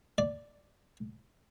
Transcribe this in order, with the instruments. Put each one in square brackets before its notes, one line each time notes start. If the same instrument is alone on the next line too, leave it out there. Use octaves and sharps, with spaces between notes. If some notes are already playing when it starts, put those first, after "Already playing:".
[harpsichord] D5